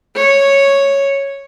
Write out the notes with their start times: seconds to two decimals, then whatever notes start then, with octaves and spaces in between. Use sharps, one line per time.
0.16 C#5